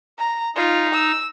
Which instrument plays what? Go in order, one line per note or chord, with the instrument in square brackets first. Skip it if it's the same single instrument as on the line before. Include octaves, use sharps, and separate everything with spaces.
[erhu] A#5
[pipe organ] D#4 [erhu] F4
[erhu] E6